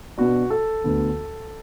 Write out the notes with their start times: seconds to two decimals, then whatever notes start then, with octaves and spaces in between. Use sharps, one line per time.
0.18 B2 B3 D4 F#4
0.50 A4
0.84 D2 D3 B3